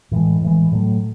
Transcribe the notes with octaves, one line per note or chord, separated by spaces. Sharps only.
A2 E3 G#3
A2 E3 G#3
A2 F#3 A3